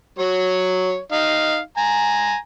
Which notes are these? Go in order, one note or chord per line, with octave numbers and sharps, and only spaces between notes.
F#3 C#5
D#4 F5
G#5 A#5